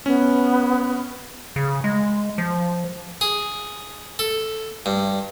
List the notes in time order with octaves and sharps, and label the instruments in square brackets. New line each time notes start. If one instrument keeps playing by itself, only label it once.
[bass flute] B3 [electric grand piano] C#4
[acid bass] C#3
G#3
F3
[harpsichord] G#4
A4
G2